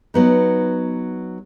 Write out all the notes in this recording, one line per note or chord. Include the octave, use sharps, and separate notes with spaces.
F#3 B3 D#4